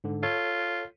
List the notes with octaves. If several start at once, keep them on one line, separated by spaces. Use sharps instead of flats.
G#2 D3
F4 A4 C#5